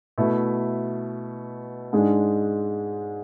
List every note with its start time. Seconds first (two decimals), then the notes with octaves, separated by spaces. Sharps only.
0.18 B2 A3 E4
1.93 G#2 G#3 D4